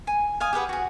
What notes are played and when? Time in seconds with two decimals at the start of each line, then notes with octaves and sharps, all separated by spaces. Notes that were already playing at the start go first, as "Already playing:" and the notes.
0.07 G#5
0.40 F5 G#5 D#6
0.53 G4 G#4 B4 F#5
0.69 F#4 G#4